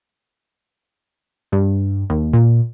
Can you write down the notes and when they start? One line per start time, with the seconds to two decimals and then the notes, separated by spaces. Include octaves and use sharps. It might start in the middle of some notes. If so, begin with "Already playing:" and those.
1.52 G2
2.10 D#2
2.33 A#2